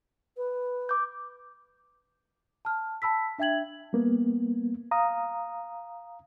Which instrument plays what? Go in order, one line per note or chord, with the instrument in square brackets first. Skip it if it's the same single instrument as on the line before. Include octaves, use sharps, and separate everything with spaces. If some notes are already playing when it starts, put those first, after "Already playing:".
[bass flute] B4
[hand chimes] D6 G6
[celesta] A5 F6
A5 B5 E6 B6
D4 E5 G5 G#6 F#7
[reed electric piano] G3 A#3 B3
F5 A#5 D#6